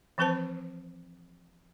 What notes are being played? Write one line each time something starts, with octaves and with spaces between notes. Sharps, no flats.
E3 F3 C4 B4 C5 A5